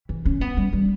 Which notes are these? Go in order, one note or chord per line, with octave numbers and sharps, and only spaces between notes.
E3
C#4
B3
G3
G3